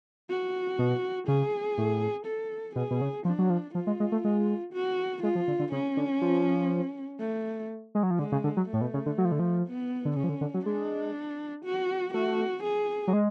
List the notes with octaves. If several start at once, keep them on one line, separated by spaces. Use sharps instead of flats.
F#4
B2
C#3 G#4
A2
A4
B2 G#4
B2
C#3
F3 D4
F#3
F3
F3 F4
G#3
G#3
A3
G#3
F#4
G#3 F4
F3
D3
D3
C#3 C#4
D3
F3
A3
G#3
F#3
F3
D3 G#3
C#3
D3
F#3
A2 A3
B2
C#3
D3
F#3
F3
D3
F3
B3
D3
C#3 C#4
F3
D3
D3
F#3
G#3 D4
F#4
A3 F#4
G#4
F#3
G#3